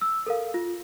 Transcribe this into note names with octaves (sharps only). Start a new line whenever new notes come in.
E6
A4 A#4 F5
F4